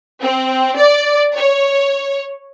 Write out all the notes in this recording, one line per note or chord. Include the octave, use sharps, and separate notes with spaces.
C4
D5
C#5